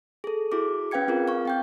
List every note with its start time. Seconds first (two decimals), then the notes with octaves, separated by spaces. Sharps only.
0.24 G#4 A4
0.52 E4 F#4 G#4 D6
0.91 C#4 B4 F5 G5 G#6 C#7
1.08 C4 F4 G#4 A#4
1.28 F5 C#6
1.45 C4 G5 G6